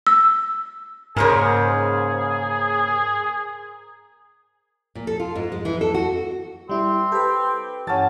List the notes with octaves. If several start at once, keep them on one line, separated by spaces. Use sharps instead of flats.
E6
G#2 C#3 A#3 C#4 G#4 A#4 C5
A#2
A4
F4
G#2
G#3
E3
A4
F#4
G3 C4 E4
G4 A4 B4
G2 E3 C#4 F#5 A5